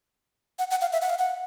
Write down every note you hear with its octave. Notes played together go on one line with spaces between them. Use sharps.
F#5
F#5
F5
E5
F#5
F5
F#5